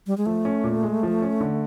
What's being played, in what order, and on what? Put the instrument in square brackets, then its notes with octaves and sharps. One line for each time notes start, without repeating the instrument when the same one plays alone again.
[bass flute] G3
G#3
[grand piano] F3 [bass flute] A3
[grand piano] C#4
A#2
G#3
F3
C#4
D3